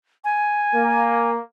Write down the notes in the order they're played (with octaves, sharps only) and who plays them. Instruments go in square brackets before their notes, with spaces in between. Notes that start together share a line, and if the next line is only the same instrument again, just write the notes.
[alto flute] G#5
[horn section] A#3